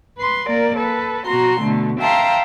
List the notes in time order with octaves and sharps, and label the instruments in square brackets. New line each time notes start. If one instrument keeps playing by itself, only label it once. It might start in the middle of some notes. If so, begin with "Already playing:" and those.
[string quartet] B4 C6
A#3 A#4 D5
A4 B4
B2 F#4 A#5 C6
B2 D3 A3
E5 F5 G5 A5 A#5 C6